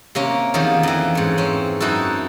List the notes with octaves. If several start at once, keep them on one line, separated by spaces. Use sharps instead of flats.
C3 A#3 C#4
E2 D#3 F3 A#3 C#4
F2 E3
G#2 C#4
C4 C#4
F#2 D#4 E4 F#4 A4